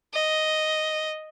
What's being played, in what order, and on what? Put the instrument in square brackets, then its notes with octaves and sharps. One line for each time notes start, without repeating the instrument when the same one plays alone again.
[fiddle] D#5